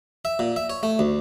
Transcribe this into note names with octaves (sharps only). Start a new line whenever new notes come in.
E5
A#2
E5
C#5
A3
D2